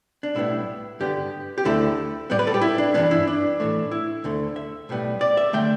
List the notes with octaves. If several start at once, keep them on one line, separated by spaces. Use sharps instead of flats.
D4
B1 A2 G3 B3 E4
G2 D3 B3 G4
G4
D2 D3 A3 E4
A2 G3 B3 D5
B4
A4
G4
E4
D4
G2 E3 G3 B3 D4
E4
D4
A2 E3 A3
E4
D2 D3 A3
E5
B1 A2 G3 B3
D5
E5
D3 A3 G5